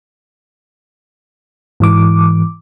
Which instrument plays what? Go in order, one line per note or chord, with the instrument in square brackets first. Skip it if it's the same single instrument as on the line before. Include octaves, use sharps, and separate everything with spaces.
[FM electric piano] G#2 E3 D6